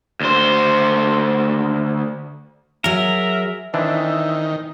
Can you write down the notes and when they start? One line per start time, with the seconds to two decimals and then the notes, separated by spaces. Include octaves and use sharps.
0.21 D2 C5
2.84 F#3 G#4 A#4 E5
3.74 D#3 E3 C4 D4 E5